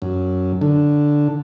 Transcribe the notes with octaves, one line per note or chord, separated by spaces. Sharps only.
F#2
D3